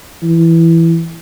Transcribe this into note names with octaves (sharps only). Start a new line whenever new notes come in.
E3